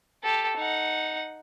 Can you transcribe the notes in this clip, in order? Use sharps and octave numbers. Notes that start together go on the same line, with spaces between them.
G4 A4
D#4 F#5